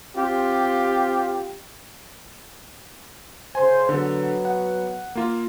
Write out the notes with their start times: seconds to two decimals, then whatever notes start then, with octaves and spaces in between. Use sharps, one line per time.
0.15 C4 F4 G4
3.55 C#3 C5 G#5
3.89 D3 F#3 B3 A4
4.45 F#5
5.15 A#3 F4